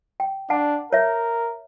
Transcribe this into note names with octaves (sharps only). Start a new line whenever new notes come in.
G5
D4 F#5 A5
A#4 C#5 E5